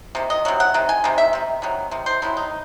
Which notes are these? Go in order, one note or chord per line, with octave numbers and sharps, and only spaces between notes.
C3 D#3
D#5
C3 D#3 F#3
F#5
C3 D#3
G#5
C3 D#3
E5
C3 D#3
C3 D#3 F#3
C3 D#3
C5
C3 D#3 F#3 E4
D#4